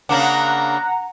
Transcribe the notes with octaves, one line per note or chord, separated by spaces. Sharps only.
C#3 A#3 D4 F#5 A#5